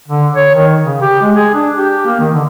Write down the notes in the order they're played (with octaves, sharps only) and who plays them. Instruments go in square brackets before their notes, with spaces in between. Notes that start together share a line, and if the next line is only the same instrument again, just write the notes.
[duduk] D3
C#5
D#3
C#3
G4
G#3
G#4
D4
G4
A#3
D#3
D3